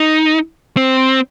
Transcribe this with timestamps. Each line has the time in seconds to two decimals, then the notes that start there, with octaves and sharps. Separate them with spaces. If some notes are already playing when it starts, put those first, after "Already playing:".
Already playing: D#4
0.77 C4